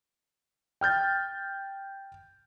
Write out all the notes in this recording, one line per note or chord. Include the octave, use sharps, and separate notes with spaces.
G5 F6 G6 A6